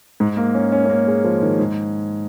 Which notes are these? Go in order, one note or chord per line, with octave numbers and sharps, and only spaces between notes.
G#2
A#3
C#4
C#4
C#4
A#3
G#3
F3
D#3
G#2